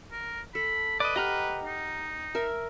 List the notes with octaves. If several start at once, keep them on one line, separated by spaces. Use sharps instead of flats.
A#4
A4 B5
B4 D5 D#5
G4 D#5 F#5 A#5 F6
D#4
A#4 E5